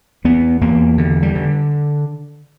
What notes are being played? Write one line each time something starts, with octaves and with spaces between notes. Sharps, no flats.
E2 B3
E2 A#3
D3
G3
D3